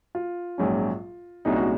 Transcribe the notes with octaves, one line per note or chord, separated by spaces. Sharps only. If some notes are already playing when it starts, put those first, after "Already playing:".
F4
A#1 G#2 F#3 C#4
C2 A#2 G#3 C#4 D#4 F#4
F#4